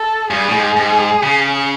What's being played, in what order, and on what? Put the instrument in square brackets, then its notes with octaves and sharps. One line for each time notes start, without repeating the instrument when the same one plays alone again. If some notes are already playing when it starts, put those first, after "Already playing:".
Already playing: [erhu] A4
[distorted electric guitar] G2 [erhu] G#4
[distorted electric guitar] A2
G#2
G#2
C#3